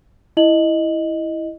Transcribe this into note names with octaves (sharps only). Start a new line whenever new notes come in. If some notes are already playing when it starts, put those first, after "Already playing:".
E4 D#5 F#7